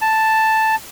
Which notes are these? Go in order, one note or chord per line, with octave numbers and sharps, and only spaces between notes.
A5